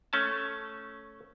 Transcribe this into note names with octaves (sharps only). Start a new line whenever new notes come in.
A3 C#4 A5